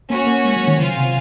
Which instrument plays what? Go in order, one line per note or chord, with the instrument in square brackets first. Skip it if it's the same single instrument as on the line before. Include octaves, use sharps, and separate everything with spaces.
[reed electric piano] A#3 [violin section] C#4 F#4 C#5
[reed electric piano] A#3
G#3
F#3
D#3
[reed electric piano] C#3 [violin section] F4 C5 F5 G#5
[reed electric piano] C3